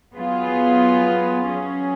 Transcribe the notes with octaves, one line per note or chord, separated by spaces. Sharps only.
F#3 B3 F4 G#4
F#3 C#4 G#4